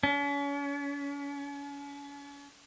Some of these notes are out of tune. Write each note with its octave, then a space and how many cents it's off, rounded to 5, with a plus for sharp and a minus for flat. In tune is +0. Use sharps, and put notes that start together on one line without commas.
C#4 +40